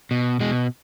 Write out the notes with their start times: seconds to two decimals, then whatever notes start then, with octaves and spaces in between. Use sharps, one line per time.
0.11 B2
0.40 B2 G#3